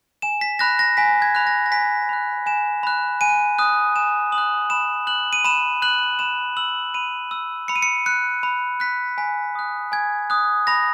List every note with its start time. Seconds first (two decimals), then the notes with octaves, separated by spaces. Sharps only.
0.22 G#5 E7
0.41 B6
0.59 B5 F#6 A#6
0.79 A#6
0.97 G#5 B6
1.22 G#6
1.35 B5 F#6
1.47 A#6
1.66 A#6
1.72 G#5 B6
2.09 B5 F#6
2.46 G#5 E7
2.83 B5 F#6
3.21 G#5 D#7
3.58 D#6 F#6
3.96 G#5 E7
4.32 D#6 F#7
4.38 F#6
4.70 B5 E7
5.07 F#6 F#7
5.33 D#7
5.44 B5 E7
5.82 F#6 F#7
6.19 B5 E7
6.57 E6 F#7
6.94 B5 D#7
7.31 E6
7.68 B5 C#7
7.76 D#7
7.82 C#7
8.06 F#6 C#7
8.43 B5
8.80 F#6 B6
9.18 G#5 B6
9.55 D#6 F#6
9.92 G#5 G#6
10.30 D#6 F#6
10.67 B5 A#6